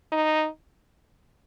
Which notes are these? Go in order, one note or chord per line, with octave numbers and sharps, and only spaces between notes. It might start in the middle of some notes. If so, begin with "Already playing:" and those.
D#4